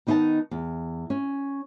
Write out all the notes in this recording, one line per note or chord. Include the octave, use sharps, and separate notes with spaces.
D#3 B3 D#4 C5 D#5 A5
E2
C#4